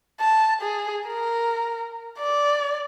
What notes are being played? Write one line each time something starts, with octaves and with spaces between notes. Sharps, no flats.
A5
G#4
A#4
D5